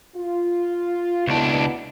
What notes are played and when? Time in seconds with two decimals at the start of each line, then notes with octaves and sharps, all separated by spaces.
0.16 F4
1.28 C#2 B2 B3 D4 E4